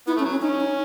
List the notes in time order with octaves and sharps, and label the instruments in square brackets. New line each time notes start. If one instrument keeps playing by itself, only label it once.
[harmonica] B3 [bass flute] E4
[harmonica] A3 [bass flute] C#4
[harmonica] F#3
[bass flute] C#4
[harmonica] C#4 [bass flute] D#4
[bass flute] D#4